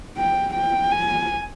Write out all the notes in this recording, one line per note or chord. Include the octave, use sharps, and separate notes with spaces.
G5
G5
G#5